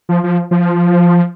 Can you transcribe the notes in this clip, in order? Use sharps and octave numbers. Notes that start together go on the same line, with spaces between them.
F3
F3
F3